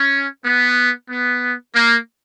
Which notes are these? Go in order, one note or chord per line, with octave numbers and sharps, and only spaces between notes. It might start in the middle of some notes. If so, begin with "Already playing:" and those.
Already playing: C#4
B3
B3
A#3